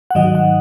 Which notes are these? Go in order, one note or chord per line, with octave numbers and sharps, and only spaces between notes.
F#5
G#2 D#3 F#3 D#5
F#5